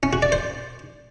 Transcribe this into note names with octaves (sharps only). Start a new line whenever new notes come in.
C#4
F#4
D5
C5